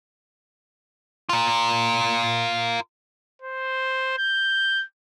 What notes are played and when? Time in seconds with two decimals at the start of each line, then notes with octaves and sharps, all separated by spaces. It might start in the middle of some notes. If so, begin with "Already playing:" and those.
1.29 F4 A#4
3.42 C5
4.18 G6